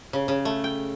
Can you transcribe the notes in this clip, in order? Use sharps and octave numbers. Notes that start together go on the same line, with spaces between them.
C#3
C#3
A3
G5